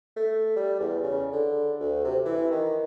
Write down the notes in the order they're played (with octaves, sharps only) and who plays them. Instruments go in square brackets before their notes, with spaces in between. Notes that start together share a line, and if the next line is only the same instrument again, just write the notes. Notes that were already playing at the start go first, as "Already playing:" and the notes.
[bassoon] A3
G3
E2
C#3
D3
D2
C3
E3
D#3